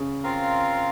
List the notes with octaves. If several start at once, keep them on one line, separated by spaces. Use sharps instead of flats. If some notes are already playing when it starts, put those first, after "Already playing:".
Already playing: C#3
C4 F4 A#4 F5